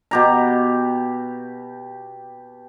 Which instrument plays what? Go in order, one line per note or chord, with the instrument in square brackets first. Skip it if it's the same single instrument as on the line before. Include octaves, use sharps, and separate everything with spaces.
[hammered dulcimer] B2 G4 A#5